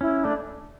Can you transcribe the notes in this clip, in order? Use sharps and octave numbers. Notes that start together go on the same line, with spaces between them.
C#4 E4
A3 D4